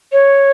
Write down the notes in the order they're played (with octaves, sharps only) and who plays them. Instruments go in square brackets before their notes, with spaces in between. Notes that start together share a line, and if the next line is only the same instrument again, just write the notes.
[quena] C#5